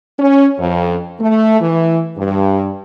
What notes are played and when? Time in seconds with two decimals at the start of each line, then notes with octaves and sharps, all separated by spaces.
0.19 C#4
0.59 F2
1.20 A3
1.61 E3
2.17 G2